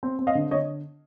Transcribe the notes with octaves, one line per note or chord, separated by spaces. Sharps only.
C4
C4
D#5 F5
D3
D3 C#5 D#5